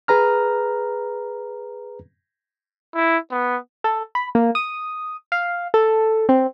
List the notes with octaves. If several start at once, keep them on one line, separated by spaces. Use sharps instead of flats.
G#4 B4 A#5 F6
E4
B3
A4
B5
A#3
D#6
F5
A4
C4